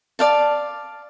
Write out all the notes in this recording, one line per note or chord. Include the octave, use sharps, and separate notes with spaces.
D5 F5 A5